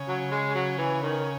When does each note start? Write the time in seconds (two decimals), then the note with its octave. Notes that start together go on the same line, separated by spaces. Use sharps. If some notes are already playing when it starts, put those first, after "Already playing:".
Already playing: C#3
0.08 F#3
0.31 G#3
0.55 F#3
0.78 E3
1.02 D#3